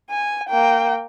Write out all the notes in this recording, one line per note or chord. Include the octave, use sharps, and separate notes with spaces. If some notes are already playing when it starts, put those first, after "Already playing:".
G#5
A#3 G5